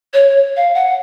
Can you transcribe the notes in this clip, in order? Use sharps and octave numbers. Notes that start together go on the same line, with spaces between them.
C#5
F5
F#5